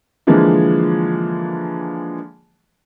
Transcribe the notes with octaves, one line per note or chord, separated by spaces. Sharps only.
D3 E3 F3 G#3 A#3